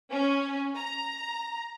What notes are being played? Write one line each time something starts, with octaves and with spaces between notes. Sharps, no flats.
C#4
A#5